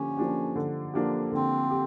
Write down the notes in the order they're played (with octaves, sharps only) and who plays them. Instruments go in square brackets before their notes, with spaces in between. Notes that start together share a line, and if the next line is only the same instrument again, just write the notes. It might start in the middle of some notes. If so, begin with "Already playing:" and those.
Already playing: [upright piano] D3 F3 A#3 G4 [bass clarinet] C#4
[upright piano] F3 A#3 D4 G4
D3
F3 A#3 D4 G4
[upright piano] D3 [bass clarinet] C4
[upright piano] G4